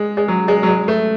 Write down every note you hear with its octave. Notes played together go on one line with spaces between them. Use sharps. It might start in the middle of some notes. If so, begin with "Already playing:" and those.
Already playing: G#3
G#3
F#3
G#3
F#3
G#3
A3